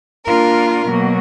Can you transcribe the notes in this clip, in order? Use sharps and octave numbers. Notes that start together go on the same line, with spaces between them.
A#3 D4 F4 A#4
B2 F#3 A#3